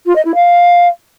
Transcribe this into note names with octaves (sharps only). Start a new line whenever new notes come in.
F4
D#5
E4
F5